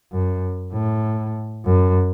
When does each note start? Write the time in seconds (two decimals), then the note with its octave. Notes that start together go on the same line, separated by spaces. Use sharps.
0.12 F#2
0.74 A2
1.65 F#2